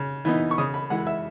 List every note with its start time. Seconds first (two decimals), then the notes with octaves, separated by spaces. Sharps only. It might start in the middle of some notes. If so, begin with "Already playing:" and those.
Already playing: C#3
0.25 E3 B3 D#4
0.51 C#6
0.58 C#3 D#6
0.74 B5
0.90 E3 G#3 F#5
1.07 E5